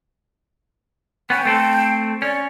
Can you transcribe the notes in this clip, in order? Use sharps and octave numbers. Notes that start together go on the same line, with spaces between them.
B3 C#4 G5
A3 C4 A4
C#4 D5